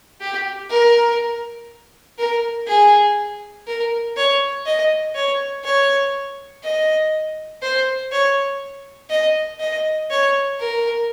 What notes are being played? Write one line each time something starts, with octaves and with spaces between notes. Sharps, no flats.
G4
A#4
A#4
G#4
A#4
C#5
D#5
C#5
C#5
D#5
C5
C#5
D#5
D#5
C#5
A#4